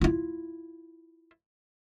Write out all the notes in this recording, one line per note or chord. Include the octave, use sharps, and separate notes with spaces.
E4 F4